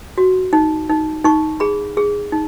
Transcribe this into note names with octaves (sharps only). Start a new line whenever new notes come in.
F#4
D#4
D#4
D#4 C#6
G#4 B5
G#4
D#4